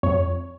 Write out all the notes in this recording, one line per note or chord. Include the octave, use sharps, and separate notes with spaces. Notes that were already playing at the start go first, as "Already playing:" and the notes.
F2 C#5